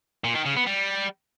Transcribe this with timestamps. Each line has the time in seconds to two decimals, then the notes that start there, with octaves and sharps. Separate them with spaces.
0.24 A#2
0.35 D#3
0.45 C#3
0.56 B3
0.66 G3